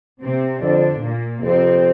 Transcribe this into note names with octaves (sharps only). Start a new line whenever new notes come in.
C3 C4
F2 D3 D4
A#2 A#3
F2 C3 C4